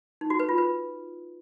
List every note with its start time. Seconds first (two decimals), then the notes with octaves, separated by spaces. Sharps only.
0.21 D#4
0.30 F#4
0.39 B4
0.49 F4
0.58 B4